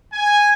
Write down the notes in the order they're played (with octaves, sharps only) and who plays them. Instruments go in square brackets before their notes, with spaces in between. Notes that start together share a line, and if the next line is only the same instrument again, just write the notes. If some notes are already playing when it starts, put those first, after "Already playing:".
[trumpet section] G#5